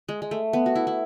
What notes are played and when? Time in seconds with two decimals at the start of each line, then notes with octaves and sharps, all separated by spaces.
0.09 G#3
0.22 G#3
0.31 A3
0.53 B3
0.66 F#4
0.75 E4
0.87 E4